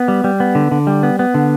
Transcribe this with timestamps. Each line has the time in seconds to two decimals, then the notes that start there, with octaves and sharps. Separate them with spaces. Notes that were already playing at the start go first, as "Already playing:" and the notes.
Already playing: B3
0.08 G3
0.24 G3
0.40 B3
0.55 D3
0.71 D3
0.87 G3
1.03 B3
1.19 B3
1.34 D3